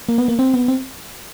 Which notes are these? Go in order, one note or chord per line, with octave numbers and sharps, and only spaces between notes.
A#3
B3
A#3
C4
B3
C4